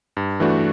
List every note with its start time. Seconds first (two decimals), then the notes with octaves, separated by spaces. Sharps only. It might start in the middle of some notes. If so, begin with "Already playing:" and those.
0.17 G2
0.40 E3 A3 D4 F#4